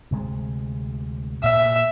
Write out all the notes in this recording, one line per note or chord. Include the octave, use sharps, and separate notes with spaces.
D2 C3 G#3
A#2 E5